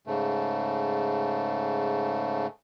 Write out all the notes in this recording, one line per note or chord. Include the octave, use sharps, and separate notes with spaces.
G#2 C#3 A3